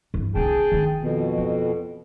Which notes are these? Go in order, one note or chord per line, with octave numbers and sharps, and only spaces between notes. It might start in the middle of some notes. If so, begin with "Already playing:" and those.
G2 E3
C2 D3 G#4 G5 A5
D#3 D4
F2 B2
E3